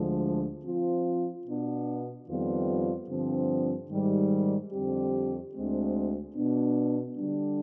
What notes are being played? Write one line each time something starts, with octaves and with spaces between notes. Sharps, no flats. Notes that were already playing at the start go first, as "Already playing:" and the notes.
Already playing: D2 D3 F3 G#3
F3 C4 F4
B2 B3 D4
F2 D#3 G3 B3 F4
G2 D3 F3 C4
G#2 D#3 G3
F2 D3 G3 C4 G4
D2 D3 G#3 C4
B2 B3 D4
D3 G3 D4